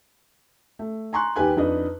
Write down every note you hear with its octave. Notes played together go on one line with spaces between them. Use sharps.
A3
G#5 A#5 C6 C#6 F#6
D#2 G4 B4 G#5 F#6
F2 D4 D#4 B4 D#5